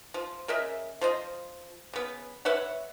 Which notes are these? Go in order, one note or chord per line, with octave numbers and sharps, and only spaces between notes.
F3
C#3 A#4 D#5 E5
F3 C5 D#5
C#3 B3
B4 C#5 E5 F#5